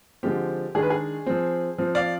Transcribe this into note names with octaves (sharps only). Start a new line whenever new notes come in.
D3 F3 G#3 C4 G4
D#3 G#3 D4 G#4
B4
G#4
F3 C4
F3 C4
D5 F5